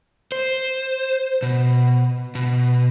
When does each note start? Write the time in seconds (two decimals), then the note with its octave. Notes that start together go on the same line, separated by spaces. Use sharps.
0.32 C5
1.42 B2
2.35 B2